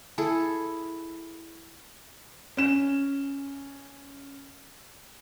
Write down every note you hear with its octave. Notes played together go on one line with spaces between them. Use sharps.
E4 G#4 A4
C#4 E7